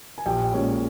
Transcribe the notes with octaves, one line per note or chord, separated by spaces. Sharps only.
G#5
A#1 G4 G5
A#2 G#3 C#4